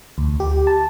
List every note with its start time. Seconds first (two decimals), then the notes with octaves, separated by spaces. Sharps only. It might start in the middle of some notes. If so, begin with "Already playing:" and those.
0.18 D2
0.40 G4
0.67 A5